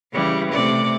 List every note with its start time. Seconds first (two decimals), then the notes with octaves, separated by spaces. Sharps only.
0.12 C#3 E3 G3
0.51 C3 A3 D5